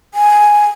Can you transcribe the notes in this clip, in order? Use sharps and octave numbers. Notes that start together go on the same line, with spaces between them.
G#5